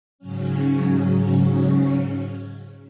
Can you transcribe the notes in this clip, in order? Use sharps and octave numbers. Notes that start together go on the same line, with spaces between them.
G#2 C#3 F#3 C#4